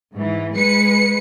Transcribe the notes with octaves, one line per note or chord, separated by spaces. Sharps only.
G#2 E3
G#3 B4 C#7